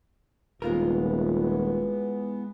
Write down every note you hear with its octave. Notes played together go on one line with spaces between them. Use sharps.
D#1 E3 G#3 B3 F4 A#4